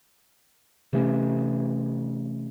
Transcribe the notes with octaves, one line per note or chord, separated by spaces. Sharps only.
C3 E3 A3 C#4